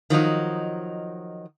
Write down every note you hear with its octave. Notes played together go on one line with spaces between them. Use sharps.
D#3 F3 F#3 D#4